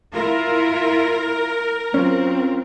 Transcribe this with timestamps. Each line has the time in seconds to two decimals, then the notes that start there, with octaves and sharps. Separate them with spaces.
0.14 E4 F4 A#4
1.94 F#3 C4 C#4 F4